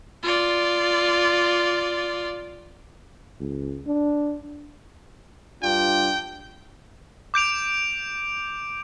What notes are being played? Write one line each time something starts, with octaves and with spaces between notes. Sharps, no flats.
F4 D5
C#2
D4
G2 D4 F4 G5
D6 G6 D7 F7